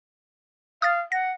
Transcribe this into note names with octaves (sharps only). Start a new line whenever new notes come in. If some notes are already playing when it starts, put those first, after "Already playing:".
F5 D#6 F6 A6
F#5 A#6